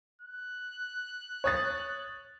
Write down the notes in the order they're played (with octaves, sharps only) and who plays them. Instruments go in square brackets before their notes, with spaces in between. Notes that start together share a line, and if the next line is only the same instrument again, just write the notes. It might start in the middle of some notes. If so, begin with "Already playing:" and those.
[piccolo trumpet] F#6
[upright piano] C#5 D#6 A6